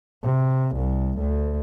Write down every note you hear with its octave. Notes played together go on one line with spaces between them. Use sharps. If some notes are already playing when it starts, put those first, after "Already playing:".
C3
C2
D2